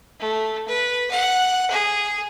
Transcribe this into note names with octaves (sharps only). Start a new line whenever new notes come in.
A3
B4
F#5
G#4